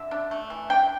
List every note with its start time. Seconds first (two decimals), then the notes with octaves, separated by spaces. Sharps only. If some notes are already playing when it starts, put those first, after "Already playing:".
Already playing: D3 E5
0.11 D4
0.31 A3
0.50 E3
0.70 D4 G5